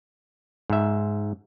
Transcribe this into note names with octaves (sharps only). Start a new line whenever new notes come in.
G#2 E5